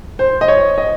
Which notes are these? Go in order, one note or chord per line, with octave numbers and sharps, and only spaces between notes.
C5
D#5
C#5
D#5